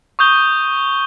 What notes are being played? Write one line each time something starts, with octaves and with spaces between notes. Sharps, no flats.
C#6 D#6 G6 G7